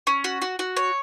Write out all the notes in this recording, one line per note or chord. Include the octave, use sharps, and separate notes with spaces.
C#4
F#4
F#4
F#4
C#5